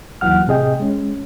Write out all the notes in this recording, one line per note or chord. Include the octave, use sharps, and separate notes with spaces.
D#2 E3 F#3 F#5 F6
A2 C3 G#4 D#5 G5
G#3 C#4